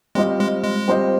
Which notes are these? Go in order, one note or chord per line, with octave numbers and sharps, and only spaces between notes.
G3 G#3 C4 F4 C5 D#5
G#3
G#3
G3 C4 F4 C5 D#5